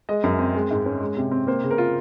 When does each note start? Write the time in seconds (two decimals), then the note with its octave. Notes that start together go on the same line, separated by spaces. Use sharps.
0.09 G#3 D#5
0.24 F#2
0.39 C4
0.55 G#3
0.71 G#2
0.86 C#4
1.01 G#3
1.17 C3
1.31 C4
1.47 A#3 C5
1.64 C#3
1.71 A#4
1.78 F4